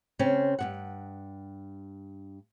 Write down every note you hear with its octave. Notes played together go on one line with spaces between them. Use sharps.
C#3 C4 C#4
G2 C#3 F#5